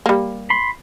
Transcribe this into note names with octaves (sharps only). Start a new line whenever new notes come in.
G3 A#3
B5 C6